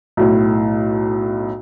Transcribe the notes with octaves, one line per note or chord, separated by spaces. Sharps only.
B1 A2